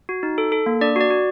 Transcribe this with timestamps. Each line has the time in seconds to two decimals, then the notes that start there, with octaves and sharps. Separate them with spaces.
0.09 F#4
0.23 D#4
0.38 A4
0.52 A4
0.66 A#3
0.81 D4 D5
0.96 F#4 D5
1.10 F#4